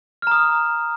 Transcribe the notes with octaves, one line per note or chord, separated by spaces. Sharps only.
A#5 D#6 F6